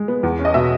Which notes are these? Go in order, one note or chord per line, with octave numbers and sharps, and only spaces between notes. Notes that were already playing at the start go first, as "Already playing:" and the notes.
Already playing: G#3
B3
E2
C#4
D#5
B2 E5